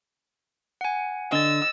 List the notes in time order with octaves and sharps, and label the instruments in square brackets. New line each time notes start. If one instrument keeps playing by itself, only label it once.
[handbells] F#5 G#5
[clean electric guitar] D3 [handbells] D#5 A6 [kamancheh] E6